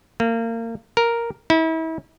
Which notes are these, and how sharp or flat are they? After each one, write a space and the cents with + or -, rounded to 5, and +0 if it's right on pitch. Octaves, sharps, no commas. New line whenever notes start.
A#3 -30
A#4 +0
E4 -35